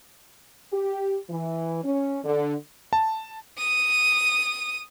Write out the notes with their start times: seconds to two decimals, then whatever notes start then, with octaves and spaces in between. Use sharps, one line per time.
0.73 G4
1.30 E3
1.84 C#4
2.24 D3
2.93 A5
3.58 D#6 D#7